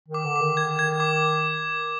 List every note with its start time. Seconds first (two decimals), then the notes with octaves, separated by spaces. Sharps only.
0.08 D#3
0.14 D6
0.25 D3
0.36 D6
0.41 D#3
0.57 G#6
0.79 G#6
1.00 D6